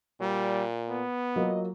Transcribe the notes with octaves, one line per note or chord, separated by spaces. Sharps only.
A#2 G3
B3
F#3 A#3 F4 D#5